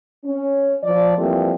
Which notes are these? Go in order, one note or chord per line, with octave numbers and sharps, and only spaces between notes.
C#4
F3 D5
E3 F3 G3 A3 A#3 C4